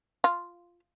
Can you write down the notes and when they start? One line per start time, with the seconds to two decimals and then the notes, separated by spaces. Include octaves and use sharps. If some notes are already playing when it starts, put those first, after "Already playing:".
0.24 F4